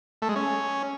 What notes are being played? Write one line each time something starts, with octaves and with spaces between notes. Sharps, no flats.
A3
G#3
C#4